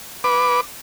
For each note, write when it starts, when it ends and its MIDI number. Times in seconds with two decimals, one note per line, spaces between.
0.24 0.61 71
0.24 0.61 86